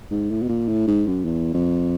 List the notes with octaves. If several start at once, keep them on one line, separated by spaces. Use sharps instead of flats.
G#2
A2
B2
A#2
A2
G#2
F#2
E2
F2